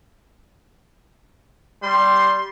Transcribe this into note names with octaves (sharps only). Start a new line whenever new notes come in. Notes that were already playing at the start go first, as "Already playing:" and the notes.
G3 C6